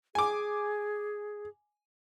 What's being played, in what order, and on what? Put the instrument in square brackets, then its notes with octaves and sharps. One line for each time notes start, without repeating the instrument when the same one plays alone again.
[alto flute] G#4 [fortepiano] G#5 D6